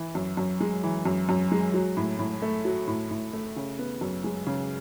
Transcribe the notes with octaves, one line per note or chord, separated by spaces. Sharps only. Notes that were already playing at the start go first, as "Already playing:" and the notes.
Already playing: E3
F#2
F#2
G#3
E3
F#2
F#2
G#3
F#3
A2
A2
A3
F#3
A2
A2
A3
C#3
B3
F#2
G#3
C#3